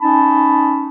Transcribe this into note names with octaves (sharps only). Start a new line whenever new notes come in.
C#4 D#4 A5 B5